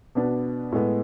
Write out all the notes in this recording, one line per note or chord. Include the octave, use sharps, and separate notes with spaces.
B2 B3 D4
A2 G#3 B3